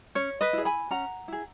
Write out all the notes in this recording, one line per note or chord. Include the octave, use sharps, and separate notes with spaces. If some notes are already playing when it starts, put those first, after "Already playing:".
C#4 C#5
B4 D#5
E4 G#4
G#5 B5
C#4 F#5 A#5
E4 G#4